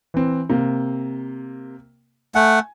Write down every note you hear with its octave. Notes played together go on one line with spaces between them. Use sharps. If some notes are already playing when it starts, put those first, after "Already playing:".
E3 C4
C3 A#3
A3 F#5 G#5